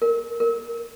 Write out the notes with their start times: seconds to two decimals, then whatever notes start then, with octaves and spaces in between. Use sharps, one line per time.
0.02 A#4
0.40 A#4